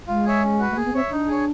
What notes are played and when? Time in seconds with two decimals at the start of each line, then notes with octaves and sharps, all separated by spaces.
0.08 G#3 F4
0.25 G#4 C#5 E5
0.43 C#4
0.59 F#4 B4
0.71 A3
0.76 A#3 G#4
0.85 B3
0.93 C4 C#5 E5
1.11 D4 D#4
1.28 G#4 C#5